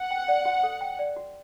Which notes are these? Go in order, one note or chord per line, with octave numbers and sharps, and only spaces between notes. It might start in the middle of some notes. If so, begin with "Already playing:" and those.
Already playing: F#5
G5
D5
F#4
A4
G5
D5
F#4